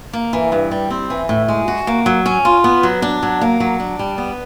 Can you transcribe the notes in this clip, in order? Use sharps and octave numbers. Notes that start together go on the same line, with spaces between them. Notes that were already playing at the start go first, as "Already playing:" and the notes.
A#3
E3
G2
G3
C4
E3
A2
G#3
F#4
A#3
F#3
C#4
F4
B3
F#3
D4
F#3
A#3
F#3
D4
G3
B3